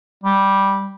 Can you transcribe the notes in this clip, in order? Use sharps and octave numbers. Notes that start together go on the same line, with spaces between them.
G3